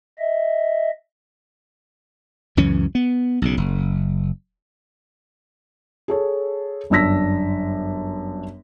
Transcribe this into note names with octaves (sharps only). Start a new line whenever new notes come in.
D#5 E5
C#2 F#2 E3 C#4
B3
B1 C#3
F#1
G#4 A4 C#5
G1 F#2 D4 E6 A#6 B6